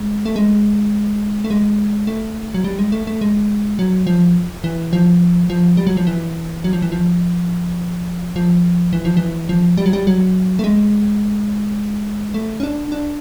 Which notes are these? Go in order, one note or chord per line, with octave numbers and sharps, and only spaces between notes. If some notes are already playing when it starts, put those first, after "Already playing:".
Already playing: G#3
A3
G#3
A3
G#3
A3
F#3
G3
G#3
A3
A3
G#3
F#3
F3
E3
F3
F3
G3
F#3
F3
E3
F#3
F3
E3
F3
F3
E3
F3
E3
F3
G3
F#3
G3
F#3
A3
G#3
A3
C#4
D4
D4